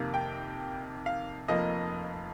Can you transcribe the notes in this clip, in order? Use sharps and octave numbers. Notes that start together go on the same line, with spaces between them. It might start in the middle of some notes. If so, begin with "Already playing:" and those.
Already playing: F2 C3 D#3 A#3
G5
F5
F1 F2 F3 A#3 D#5